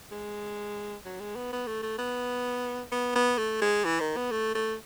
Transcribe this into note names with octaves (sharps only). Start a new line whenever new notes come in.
G#3
F#3
G#3
B3
B3
A3
A3
B3
B3
B3
A3
G#3
E3
D#3
B3
A3
A3